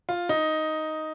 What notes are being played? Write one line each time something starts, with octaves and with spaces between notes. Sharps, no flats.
F4
D#4